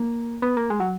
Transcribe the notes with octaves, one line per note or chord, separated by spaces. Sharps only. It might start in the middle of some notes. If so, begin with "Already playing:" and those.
Already playing: A#3
B3
A#3
G#3
F#3